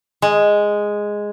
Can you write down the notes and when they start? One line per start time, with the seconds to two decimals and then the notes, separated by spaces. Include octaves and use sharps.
0.22 G#3